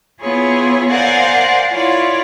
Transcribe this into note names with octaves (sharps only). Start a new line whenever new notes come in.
B3 E4 F4 G#4 C#5
A#4 C5 D5 F5 F#5 G#5
E4 F4 C#5 D5 F5